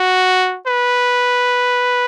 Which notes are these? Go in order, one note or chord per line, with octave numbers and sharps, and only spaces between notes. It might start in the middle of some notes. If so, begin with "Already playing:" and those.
Already playing: F#4
B4